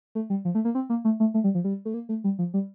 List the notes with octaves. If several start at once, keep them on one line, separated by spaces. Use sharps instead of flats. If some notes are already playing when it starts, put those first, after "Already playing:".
A3
G3
F3
A3
A#3
C4
A#3
A3
A3
A3
G3
F3
G3
A3
A#3
A3
G3
F3
G3